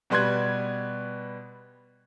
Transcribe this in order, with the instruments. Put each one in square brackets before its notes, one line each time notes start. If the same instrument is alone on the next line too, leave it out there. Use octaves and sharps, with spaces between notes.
[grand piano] B2 G3 B4 C6 F#6 G#6